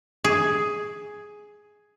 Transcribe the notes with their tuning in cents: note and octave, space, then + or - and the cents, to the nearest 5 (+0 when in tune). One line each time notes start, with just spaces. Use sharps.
G#4 +5